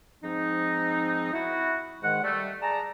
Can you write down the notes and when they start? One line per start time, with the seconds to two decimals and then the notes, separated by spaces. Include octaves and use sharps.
0.24 G#2 F3 C4 D#4
1.33 E4 F#4
2.03 G#2 D#3 G#3 F#5
2.23 G3 A3
2.61 G#4 D5 A5 A#5